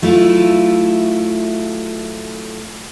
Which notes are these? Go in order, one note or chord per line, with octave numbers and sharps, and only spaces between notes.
F#3 A3 E4 F4